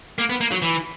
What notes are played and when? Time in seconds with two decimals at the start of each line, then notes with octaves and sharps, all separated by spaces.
0.18 A#3
0.30 B3
0.41 A#3
0.52 F#3
0.62 E3